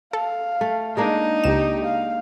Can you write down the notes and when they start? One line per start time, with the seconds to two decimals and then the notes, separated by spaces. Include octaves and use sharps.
0.13 A4 F5
0.61 A3
0.97 G#3 A#3 D4 D#4
1.44 C#2 G4 E7
1.85 F5